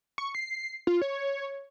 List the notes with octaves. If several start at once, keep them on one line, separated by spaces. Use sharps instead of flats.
C#6
C7
F4
C#5